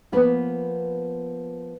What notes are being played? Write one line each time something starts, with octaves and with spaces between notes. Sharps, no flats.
F3 A#3 B3 B4